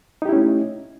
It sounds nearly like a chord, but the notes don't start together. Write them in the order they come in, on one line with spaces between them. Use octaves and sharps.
D#4 G4 E4 C#4 A3